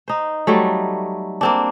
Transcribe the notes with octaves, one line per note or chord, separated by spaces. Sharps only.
D#4 C5
F#3 G3 A3
A#3 C4 D4